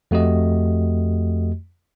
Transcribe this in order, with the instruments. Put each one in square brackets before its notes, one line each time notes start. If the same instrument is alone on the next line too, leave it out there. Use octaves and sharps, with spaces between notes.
[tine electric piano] F2 A3 F#4 G4 D#5